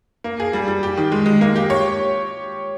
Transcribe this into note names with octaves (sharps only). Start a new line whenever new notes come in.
A#3
G#4
G3
G3
G4
D#3
G#3
G#3
A#3
G4
C#5